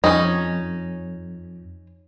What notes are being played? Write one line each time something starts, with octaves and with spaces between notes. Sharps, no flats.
F2 C#4 D#4